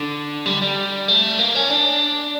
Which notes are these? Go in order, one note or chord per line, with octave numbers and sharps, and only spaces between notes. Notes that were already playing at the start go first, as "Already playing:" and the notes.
Already playing: D3
G3
G3
A3
A#3
C#4
D4